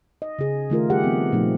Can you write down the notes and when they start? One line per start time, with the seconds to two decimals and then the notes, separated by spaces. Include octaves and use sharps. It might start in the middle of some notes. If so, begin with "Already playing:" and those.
0.22 D#5
0.39 C#3 G#4
0.70 D#3 A3 F4 A#4
0.90 G3 G4 G#4 F#5
1.03 F3 B3 C4
1.32 A#2 F3 A3 D#4